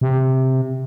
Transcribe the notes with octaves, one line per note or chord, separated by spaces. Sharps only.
C3